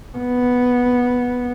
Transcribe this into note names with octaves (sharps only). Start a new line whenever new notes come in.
B3